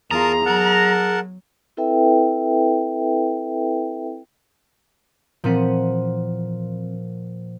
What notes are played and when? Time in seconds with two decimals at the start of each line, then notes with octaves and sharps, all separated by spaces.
0.11 E2 F4 G#4 A#4 A5 A#5 D#6
0.45 F#3 A#4 F#5 A5
1.77 C4 E4 A4 B4 E5 G5
5.44 A#2 E3 F3 C4 F#5